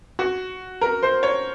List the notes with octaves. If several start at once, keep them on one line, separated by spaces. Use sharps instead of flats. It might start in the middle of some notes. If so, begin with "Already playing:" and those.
F#4
A#4
C5
C#5